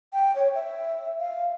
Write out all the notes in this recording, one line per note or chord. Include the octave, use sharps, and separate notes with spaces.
G5
C#5
E5
F5